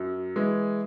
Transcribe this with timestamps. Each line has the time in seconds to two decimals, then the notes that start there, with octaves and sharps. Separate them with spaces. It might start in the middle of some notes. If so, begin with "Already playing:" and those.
Already playing: F#2
0.36 E3 G#3